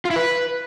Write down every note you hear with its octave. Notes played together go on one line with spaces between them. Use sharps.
F4
E4
B4